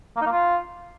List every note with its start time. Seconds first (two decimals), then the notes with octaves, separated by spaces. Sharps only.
0.16 A#3
0.21 D#4
0.26 A#3
0.31 F4